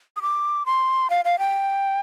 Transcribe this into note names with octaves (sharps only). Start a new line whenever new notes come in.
D#6
D6
C6
F5
F5
G5